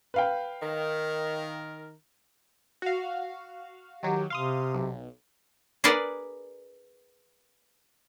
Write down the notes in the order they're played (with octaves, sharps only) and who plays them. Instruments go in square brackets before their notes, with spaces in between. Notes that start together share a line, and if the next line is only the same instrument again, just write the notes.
[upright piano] B4 F5 G5
[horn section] D#3 A#4
[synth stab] F#4 F5
[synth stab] D#3 F#3 [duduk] G4
[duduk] C3 [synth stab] F5 C6 D#6
[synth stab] B1
[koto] G#4 A#4 B4 D5 F#5